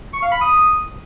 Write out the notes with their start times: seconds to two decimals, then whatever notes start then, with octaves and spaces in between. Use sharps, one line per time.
0.13 C#6
0.23 F5
0.32 B5
0.41 D#6